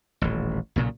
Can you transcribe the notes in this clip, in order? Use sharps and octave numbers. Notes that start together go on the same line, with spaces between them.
D#1 A1
B1 A#2 C#3 F#3